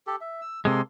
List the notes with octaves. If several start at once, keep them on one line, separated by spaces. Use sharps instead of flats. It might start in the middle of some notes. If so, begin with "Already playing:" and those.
G4 A4
E5
E6
C3 G#3 A#3 A4 C6